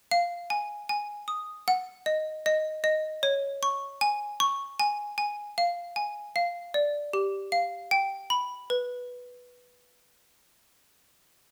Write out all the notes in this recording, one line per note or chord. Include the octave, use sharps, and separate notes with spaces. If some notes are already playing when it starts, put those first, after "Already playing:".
F5
G#5
G#5
D#6
F#5
D#5
D#5
D#5
C#5
C#6
G#5
C#6
G#5
G#5
F5
G#5
F5
D5
G4
F5
G5
B5
B4